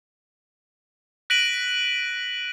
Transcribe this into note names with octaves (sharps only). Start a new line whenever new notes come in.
F#6 A#6 B6 D7 D#7 F#7